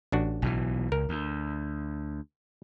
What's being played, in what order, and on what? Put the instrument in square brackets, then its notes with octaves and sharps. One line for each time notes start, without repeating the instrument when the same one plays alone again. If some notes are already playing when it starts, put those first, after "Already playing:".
[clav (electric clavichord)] A1 D4 F#4
[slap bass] B1 B2 E3
[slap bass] C#2 [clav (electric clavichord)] A#4
[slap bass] D2